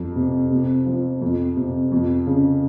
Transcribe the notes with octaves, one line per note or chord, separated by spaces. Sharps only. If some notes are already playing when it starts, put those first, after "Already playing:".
Already playing: F2
C3
C3
F3
F2
C3
F2
C#3